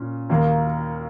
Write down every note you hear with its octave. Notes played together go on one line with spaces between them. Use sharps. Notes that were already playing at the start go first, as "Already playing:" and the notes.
Already playing: A#2 C#4
D#2 D#3 A#3